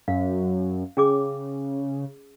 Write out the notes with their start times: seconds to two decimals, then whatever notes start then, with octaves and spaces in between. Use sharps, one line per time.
0.08 F#2 F5
0.97 C#3 C#4 G#4 D6